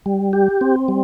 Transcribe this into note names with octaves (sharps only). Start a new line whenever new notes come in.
G3
G4
C4
G3